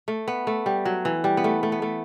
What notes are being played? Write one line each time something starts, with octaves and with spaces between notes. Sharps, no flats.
A3
B3
A3
G3
F#3
E3
G3
B3
A3
A3
B3
A3